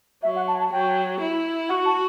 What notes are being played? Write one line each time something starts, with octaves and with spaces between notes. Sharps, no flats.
F#3 E5
F#5
A5
A5
F#3 G5
E4
F#4 F#5
A5